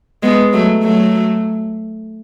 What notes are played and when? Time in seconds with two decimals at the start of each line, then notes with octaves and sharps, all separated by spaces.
0.23 G#3 B3
0.53 F#3 A3
0.83 F#3 A3